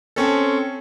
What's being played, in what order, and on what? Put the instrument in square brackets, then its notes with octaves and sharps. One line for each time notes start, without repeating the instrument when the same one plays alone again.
[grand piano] C4 C#4 A4